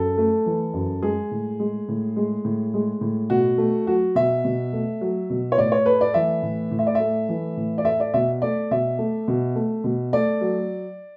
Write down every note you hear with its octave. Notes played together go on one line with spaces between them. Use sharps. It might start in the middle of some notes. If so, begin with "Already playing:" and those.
Already playing: F#2 A4
A3
E3
F#2
G#3 G#4
A2
G#3
A2
G#3
A2
G#3
A2
B2 F#4
A3
F#3 F#4
B2 E5
B2
A3
F#3
B2
C#5
A2 D5
C#5
A3 B4
D5
E3 E5
A2
A2
E5
D5
E5
A3
E3
A2
D5
A3 E5
D5
B2 E5
A3 D5
B2 E5
A3
B2
A3
B2
A3 D5
F#3